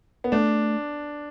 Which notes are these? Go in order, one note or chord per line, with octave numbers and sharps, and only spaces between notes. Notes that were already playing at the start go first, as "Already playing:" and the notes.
B3
A3 D4